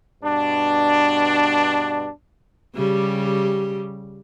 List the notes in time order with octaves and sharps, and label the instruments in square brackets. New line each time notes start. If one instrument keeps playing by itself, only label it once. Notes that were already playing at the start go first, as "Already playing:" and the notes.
[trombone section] G2 B2 D4
[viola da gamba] C#3 G3 G4